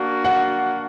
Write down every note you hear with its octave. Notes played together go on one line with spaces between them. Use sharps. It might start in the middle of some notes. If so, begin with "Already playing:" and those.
Already playing: A#3 D4 F#4
F#5